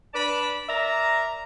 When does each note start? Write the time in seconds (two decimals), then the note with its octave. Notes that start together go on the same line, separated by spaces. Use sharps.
0.14 D4 B4 D5 A5 B5
0.69 A#4 D5 E5 A#5